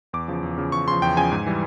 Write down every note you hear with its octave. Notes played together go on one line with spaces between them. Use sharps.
E2 D6
C#3 F3
E2
C#3 F3
E2 C#6
C#3 F3 C6
E2 G5
C#3 F3 G#5
G#2
E3 G3